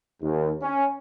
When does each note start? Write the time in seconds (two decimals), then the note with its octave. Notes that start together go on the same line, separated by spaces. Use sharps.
0.22 D#2
0.62 C#4